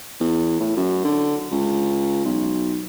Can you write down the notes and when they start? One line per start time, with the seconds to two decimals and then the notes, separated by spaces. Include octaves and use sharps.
0.20 E2
0.60 A2
0.76 F#2
1.04 D3
1.51 C#2
2.25 B1